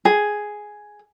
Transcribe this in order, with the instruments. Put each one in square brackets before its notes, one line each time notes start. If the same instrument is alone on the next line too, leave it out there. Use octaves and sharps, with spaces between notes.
[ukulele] G#4